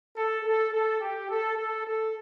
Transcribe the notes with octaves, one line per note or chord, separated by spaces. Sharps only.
A4
A4
A4
G4
A4
A4
A4